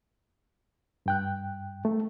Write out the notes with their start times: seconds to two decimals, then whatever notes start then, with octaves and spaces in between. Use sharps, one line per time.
1.06 G2 G5 F#6
1.85 A3